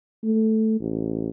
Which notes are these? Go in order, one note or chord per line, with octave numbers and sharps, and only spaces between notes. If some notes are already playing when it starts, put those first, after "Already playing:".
A3
A1